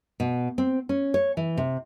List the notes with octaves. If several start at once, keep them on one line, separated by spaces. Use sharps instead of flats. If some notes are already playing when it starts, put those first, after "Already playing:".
B2
C4
C#4
C#5
E3
C3